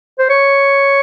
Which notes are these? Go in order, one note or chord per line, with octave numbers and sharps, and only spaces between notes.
C5
C#5